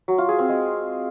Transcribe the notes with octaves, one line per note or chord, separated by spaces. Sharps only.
F#3
F4
G#4
C4
G#3